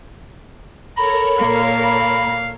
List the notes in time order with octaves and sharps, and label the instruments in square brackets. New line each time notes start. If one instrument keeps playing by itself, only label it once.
[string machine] A4 A#4 C#5 [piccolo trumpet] A#5 [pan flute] B5
[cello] A#2 A#3 [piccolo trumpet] F5
[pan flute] B5